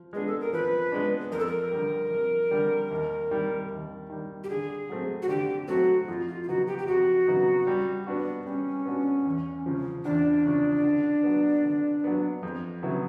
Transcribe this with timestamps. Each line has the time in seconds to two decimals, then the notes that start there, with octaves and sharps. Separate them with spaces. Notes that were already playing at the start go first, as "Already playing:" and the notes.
Already playing: F3
0.13 G#3 B3 D4 G#4
0.27 A4
0.40 A#4
0.53 F3 B4
0.92 G#3 B3 D4
1.31 F2 A#4
1.39 A4
1.47 A#4
1.71 D3 G3
2.11 F2
2.51 D3 G3
2.91 D#2
3.31 D#3 G3
3.71 D#2
4.10 D#3 G3
4.44 G4
4.49 D3 G#4
4.89 F#3 A3 C4
5.22 F#4
5.29 D3 G4
5.68 F#3 A3 C4 F#4
6.08 F2 F4
6.28 F4
6.43 F4
6.48 C#3 F#3 B3 D#4 F#4
6.67 G4
6.78 G4
6.87 F2 F#4
7.27 C#3 F#3 B3 D#4
7.67 G3
8.07 B3 D4 F#4
8.46 G3 C#4
8.86 B3 D4 F#4
9.25 E2
9.66 C#3 F3
10.04 E2 D4
10.45 C#3 F3
10.84 D3
11.23 F#3 B3
11.64 D3
12.04 F#3 B3
12.43 F2
12.83 C#3 F#3 B3 E4